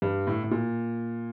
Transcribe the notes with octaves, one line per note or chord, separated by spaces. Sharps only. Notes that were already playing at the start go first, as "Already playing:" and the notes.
G2
A2
A2
A#2